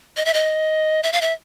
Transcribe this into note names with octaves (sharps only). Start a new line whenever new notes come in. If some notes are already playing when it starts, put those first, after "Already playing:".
D#5
E5
D#5
E5
F5
E5